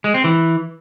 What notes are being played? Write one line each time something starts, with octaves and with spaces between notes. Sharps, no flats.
G#3
C4
E3